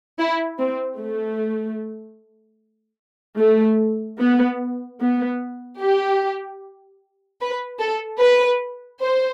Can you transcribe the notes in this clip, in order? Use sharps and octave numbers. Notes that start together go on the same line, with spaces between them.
E4
C4
A3
A3
B3
B3
G4
B4
A4
B4
C5